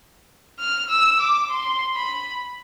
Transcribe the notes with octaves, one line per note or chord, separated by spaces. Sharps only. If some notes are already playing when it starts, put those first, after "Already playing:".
F6
E6
D6
C6
B5